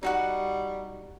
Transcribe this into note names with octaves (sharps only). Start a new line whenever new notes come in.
G3 D#4 F#4 F#5